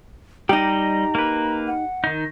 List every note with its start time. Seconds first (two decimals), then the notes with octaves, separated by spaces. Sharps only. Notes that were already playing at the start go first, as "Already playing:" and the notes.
0.49 G3 D#4 G4 D#5 A#5
1.15 A#3 B4
1.67 F#5
2.04 D#3 D#4